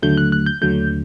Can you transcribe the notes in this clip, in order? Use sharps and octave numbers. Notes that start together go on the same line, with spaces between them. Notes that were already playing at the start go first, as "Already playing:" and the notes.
D#2 D3 F#3 A3 G6
F#6
F#6
G6
D#2 D3 F#3 A3 G6